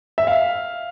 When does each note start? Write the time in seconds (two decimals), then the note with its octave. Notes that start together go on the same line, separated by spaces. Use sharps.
0.18 E5
0.27 F5